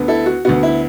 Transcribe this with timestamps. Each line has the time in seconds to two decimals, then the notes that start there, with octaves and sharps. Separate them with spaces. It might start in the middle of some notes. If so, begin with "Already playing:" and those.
Already playing: D2 D3 B3
0.08 E4 A4
0.26 F#4
0.45 D2 D3 B3 F#4
0.63 E4